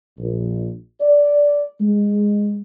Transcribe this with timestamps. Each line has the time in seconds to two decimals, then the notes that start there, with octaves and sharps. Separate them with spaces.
0.19 A#1
1.00 D5
1.81 G#3